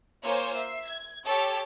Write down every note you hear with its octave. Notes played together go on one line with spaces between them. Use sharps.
A#3 F4 C5 C#5 G#5
E5 C7
G#6
G4 A4 C#5 A5